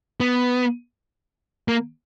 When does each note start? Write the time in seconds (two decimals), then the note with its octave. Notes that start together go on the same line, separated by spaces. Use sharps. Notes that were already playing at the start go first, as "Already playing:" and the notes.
0.20 B3
1.68 A#3